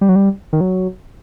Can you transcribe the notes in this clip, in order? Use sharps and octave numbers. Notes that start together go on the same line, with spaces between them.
G3
F#3
G3
D#3
F#3